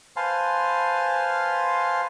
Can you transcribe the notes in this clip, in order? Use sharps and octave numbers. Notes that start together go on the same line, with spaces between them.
B4 C5 F5 G#5 A5 C6